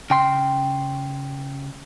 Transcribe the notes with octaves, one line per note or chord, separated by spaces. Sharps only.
C#3 G5 C6